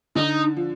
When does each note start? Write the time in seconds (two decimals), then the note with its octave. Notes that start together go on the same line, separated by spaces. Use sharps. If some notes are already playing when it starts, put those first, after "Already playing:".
0.15 D3 D#4
0.57 F3